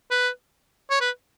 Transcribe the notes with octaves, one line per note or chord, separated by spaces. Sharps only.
B4
C#5
B4